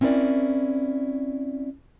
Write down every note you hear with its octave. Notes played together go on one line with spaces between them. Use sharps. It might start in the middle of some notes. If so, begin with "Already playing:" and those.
C4 C#4 E4 A#4 D5